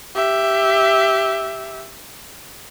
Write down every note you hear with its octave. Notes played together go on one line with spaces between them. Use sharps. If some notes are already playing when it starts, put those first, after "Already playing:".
G4 E5